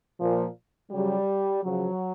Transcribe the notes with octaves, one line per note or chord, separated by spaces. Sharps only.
A#2 F3
C#3 F#3 G3
C#3 F3 F#3